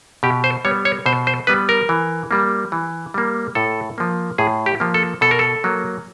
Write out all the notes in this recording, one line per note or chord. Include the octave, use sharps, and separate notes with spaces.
B2 G4
C5
G3 B3 C#5
C#5
B2 C5
C5
G3 B3 B4
A#4
E3
G3 A#3
E3
G3 A#3
A2 A4
F3 A#3
A2 G#4
G4
F3 A#3
A4
B2 A4
A#4
A4
F#3 A#3